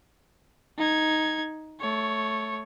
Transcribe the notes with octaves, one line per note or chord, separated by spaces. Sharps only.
D#4 G#6
A3 C#5